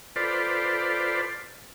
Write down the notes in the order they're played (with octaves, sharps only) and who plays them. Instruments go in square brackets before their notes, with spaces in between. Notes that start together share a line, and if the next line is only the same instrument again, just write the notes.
[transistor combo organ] F4 A4 B4 C5 D5